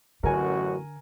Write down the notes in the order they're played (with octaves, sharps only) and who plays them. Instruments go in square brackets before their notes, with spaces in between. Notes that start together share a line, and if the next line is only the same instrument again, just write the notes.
[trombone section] A1 F#2 F#4 [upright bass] D3 [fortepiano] A#4 G#5